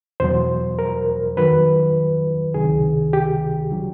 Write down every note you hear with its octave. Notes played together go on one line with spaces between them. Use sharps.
E2 B2 F#3 C5
A#4
F#2 D#3 F#3 B4
C#2 C3 D#3 G#4
G4
D3 F#3